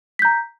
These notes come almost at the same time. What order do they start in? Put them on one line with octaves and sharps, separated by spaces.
B6 G6 A#5